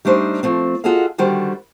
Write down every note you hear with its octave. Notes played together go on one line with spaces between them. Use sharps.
G3 A3 D4 D#4 C5
F3 A3 C4
F4 F#4 G#4 A4 D#5 F5
D3 D#3 G3 F#4 C5